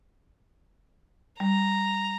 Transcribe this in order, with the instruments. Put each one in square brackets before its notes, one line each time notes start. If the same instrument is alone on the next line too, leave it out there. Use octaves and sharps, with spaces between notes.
[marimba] G3 [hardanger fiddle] A#5